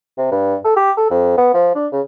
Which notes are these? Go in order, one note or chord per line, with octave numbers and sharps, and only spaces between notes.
C3
G2
A4
G4
A4
F2
B3
F3
D4
C#3